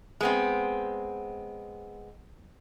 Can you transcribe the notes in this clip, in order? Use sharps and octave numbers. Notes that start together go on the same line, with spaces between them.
G#3 B3 C4